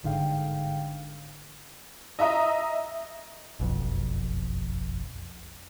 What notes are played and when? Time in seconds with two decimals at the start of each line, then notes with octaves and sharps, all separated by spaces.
0.03 G1 G#2 D3 F5 G5
2.19 D#5 E5 A#5 D#6
3.60 F#1 B1 F2